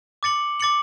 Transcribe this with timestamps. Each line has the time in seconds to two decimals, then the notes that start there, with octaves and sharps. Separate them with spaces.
0.23 D6 A6 C#7 F#7
0.60 D6 A6 C#7 F#7